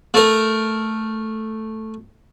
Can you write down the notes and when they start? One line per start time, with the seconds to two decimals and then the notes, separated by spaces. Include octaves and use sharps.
0.14 A3 A#4